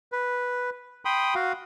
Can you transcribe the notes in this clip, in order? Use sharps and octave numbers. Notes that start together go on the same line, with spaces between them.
B4
G5 B5 C6 D#6
F#4 F5